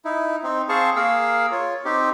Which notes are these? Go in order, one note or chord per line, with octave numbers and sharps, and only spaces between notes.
D#4 E4
C4 D#4
C4 G#4 C5 F5 A5 C#6
A#3 G#4 A#4 F5 E6
F4 C#5
C4 D#4 G4